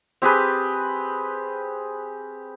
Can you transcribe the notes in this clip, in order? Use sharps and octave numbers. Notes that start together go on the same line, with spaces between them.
C4 G4 G#4 B4